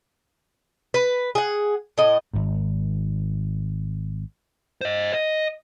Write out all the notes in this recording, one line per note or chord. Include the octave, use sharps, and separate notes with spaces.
B4
G#4 F#5
A2 D#5
G#1 G#2
C5 D#5
D#5